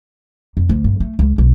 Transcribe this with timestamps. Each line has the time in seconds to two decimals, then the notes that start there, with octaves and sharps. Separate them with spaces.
0.57 F2
0.69 D2
0.84 G2
1.00 A3
1.19 C#2
1.38 B1